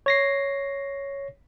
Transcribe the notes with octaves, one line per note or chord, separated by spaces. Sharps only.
C#5 A#6 C7